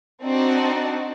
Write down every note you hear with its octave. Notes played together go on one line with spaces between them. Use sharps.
C4 D4 D#4 F#4 D5